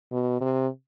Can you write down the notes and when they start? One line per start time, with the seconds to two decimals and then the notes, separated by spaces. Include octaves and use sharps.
0.12 B2
0.41 C3